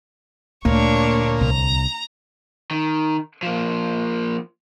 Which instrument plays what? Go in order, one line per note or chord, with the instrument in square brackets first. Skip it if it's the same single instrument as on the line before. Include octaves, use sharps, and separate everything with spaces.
[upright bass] D2 [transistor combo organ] A#2 [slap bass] A#3 [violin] D4 C#5
[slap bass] C2 [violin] A#5
[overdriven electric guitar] D#3
F3 A#3